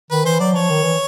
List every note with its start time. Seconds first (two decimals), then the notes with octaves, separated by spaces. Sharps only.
0.11 D#3 B4
0.25 E3 C5
0.40 F#3 D5
0.54 F3 C#5
0.70 D#3
0.84 E3